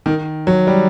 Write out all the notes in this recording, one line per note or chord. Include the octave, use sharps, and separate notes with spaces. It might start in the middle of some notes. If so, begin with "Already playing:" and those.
D#3
F#3
G3